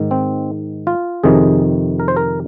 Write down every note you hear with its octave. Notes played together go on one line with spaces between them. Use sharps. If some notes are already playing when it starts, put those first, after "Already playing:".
Already playing: G#2 D#3
C4
F4
F2 C3 D#3 G#4
A#4
C5
A#4